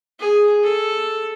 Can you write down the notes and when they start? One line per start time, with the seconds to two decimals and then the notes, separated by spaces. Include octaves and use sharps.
0.20 G#4
0.63 A4